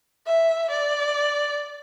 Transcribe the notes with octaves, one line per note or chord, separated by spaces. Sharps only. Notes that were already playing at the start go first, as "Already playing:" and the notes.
E5
D5